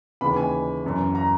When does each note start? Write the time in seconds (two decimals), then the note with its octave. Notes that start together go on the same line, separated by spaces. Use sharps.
0.21 D#2 C#3 E3 B5
0.36 G#5
0.84 F#2 E3
1.15 A#5